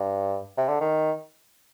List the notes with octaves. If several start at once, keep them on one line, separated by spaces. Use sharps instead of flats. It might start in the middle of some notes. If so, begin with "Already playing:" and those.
Already playing: G2
C3
D3
D#3